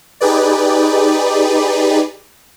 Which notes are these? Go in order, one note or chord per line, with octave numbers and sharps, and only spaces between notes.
D#4 G4 G#4 B4 D5